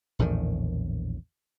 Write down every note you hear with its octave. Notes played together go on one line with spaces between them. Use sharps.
A#1 E2 A2 D#3